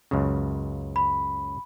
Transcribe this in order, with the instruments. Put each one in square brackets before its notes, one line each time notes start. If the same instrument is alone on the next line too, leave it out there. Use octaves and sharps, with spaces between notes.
[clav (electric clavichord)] C#2 F#2 C#3
[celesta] B5